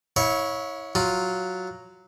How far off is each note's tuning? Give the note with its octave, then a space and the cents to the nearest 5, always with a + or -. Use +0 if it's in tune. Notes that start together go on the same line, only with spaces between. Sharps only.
E4 -25 C#5 +0 F5 +40
F#3 +0 F4 +0